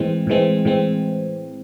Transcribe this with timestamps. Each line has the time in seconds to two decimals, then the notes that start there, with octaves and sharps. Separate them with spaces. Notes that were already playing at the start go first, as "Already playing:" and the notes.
Already playing: A2 E3 G#3 C4
0.27 A2 E3 G#3 C4
0.65 A2 E3 G#3 C4